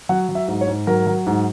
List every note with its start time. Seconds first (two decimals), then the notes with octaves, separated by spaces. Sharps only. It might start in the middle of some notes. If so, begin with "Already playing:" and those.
0.09 F#3 F#5
0.29 F#3
0.35 E5
0.48 G#2
0.61 C#5
0.67 G#2
0.87 F#3 A#4
1.07 F#3
1.27 G#2